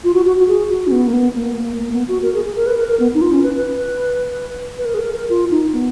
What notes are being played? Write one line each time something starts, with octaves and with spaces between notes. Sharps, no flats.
F4
F#4
F#4
F#4
G#4
F#4
C#4
B3
A#3
B3
A#3
A#3
A#3
B3
F#4
A#4
G#4
G#4
A#4
B4
A#4
A#4
B3
D#4
F4
C#4
B4
B4
B4
A#4
G#4
A#4
A#4
F4
D#4
B3